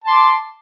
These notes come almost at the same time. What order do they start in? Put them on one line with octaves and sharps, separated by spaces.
A5 C6 D6